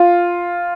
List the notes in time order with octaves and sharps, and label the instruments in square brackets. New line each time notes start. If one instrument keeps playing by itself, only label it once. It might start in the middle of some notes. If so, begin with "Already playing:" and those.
Already playing: [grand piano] F4